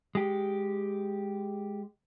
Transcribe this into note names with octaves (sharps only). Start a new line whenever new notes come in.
G#3 G4